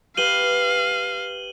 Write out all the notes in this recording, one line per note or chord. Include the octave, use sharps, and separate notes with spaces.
G4 B4 F5 G5 D#7 F#7 G7